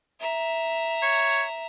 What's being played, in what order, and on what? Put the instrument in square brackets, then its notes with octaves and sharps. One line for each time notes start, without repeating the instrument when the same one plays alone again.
[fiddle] E5 A#5
[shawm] C#5